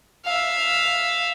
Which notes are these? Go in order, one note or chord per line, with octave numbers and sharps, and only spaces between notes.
E5 F5